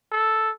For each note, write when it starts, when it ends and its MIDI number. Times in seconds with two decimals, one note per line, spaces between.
0.12 0.51 69